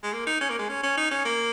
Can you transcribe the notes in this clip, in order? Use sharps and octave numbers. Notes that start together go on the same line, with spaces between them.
G#3
A#3
D#4
C#4
A#3
G#3
C#4
C#4
D#4
C#4
A#3